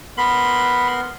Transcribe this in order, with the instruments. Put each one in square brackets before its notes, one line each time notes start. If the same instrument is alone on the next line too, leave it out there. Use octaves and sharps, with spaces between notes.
[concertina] B3 A#4 C6 [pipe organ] B5